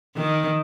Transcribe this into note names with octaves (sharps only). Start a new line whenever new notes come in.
D#3